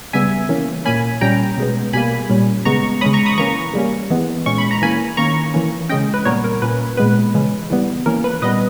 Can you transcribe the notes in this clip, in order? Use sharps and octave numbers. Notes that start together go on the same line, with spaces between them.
C#3 G3 B3 E5 G#5
E3 A#3 C#4
A#2 A#3 C#4 G#5 B5
A#2 G3 C#4 G5 A#5
B2 G#3 B3
B2 G3 A#3 G#5 B5
A#2 G3 C#4
C#3 G#3 B3 A#5 C#6
C#3 G#3 C#4 B5 D#6
A#5 C#6
B5 D#6
E3 A#3 C#4 A#5 C#6
C#3 G3 A#3 C#4
E3 G#3 B3
A#2 G#3 C#4 C#6
B5
A#5
E3 A#3 C#4 G#5 B5
D#3 A#3 C#4 A#5 C#6
E3 A#3 C#4
C#3 G#3 C#4 D#5 G5
B4
A#2 G3 B3 A#4 C#5
A#4
A#2 A#3 C#4 B4
A#2 G#3 B3 B4
C#3 E3 G#3 C#4
E3 G3 B3
E3 A#3 C#4 A#4
B4
A#2 G3 B3 B4 D#5